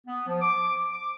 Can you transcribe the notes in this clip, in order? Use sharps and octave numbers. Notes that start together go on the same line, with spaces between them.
B3
F3
D6
D6